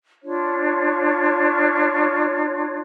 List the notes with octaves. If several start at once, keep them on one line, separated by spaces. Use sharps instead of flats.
D4 F4 C#5